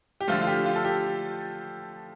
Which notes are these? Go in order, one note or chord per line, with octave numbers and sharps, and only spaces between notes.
G4
D3 F3 A3 F4
F4
G4
F4
A4
G4